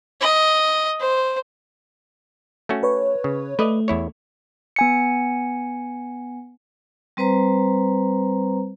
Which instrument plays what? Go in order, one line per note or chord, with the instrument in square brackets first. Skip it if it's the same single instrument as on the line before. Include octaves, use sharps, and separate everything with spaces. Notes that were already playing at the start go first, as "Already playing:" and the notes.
[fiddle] D#5
C5
[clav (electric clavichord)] A3 C#4 F#4
[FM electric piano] B4 C#5
[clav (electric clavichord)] C#3
[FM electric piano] A3 [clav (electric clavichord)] B4 D5 D#5
[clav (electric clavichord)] E2 E4 C#5
[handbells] B3 G#5 C#7
[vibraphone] G3 C4 B4 C5 A#5